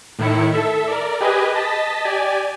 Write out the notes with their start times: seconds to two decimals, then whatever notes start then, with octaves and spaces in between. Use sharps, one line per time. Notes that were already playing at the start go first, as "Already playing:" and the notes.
0.19 A2 D#3 E4 C#7
0.54 A4 E5
0.88 A#4 D5
1.20 G4 G#4 B4 D#5 G#5
1.55 D#5 A5 A6 B6
2.05 G4 D5 G#5